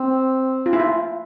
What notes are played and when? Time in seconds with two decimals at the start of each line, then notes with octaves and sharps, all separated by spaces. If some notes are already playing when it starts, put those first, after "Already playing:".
Already playing: C4
0.66 F4
0.73 E4
0.80 F4